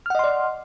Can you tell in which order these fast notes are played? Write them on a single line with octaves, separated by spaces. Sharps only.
F6 F#5 D#5 C6 D5